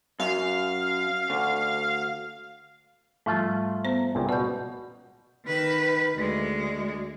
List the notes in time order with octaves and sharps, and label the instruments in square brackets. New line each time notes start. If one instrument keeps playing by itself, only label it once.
[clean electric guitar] F#2 [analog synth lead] F5
[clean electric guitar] D2
[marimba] G#2 F3 G3 [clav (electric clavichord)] A3 F4
[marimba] B3 C5 A#5
[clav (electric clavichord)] C#2 A#2
[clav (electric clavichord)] B2 [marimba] D5 G6
[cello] D#3 B4
D2 G#3